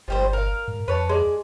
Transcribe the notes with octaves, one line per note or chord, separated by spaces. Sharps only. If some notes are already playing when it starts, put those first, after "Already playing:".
G1 F3 G3 C5
A#4 F5
G#2
F2 B4 C#5 A5
G#3 D5